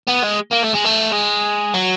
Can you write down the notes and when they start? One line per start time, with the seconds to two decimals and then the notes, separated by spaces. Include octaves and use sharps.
0.08 B3
0.24 G#3
0.52 A#3
0.64 A3
0.75 G#3
0.86 A3
1.13 G#3
1.74 F#3